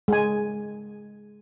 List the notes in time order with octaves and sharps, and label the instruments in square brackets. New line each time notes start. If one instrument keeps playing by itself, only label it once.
[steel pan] G#3 G#5